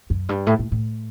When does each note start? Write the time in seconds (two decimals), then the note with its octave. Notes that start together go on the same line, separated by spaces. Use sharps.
0.10 F#2
0.29 G2
0.47 A2
0.59 A2
0.72 A2